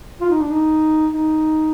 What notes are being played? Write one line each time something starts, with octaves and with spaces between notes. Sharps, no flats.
F4
D#4
D4
D#4
D#4